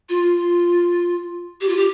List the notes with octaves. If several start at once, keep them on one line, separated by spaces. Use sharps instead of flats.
F4
G4
F4
G4